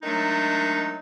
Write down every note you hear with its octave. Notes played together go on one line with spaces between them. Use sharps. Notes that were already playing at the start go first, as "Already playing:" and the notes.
D#3 F#3 G#3 A3 D4 D#4